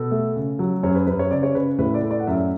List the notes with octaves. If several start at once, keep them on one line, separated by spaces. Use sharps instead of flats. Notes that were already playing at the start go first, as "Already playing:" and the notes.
Already playing: B2 A4
A3
C#3
F#3
F#2 C#5
B4
F#2 B4
C#5
C#3 D5
C#5
C#3 B4
A2 B4
D5
A3
D5
F#5
F#2 E5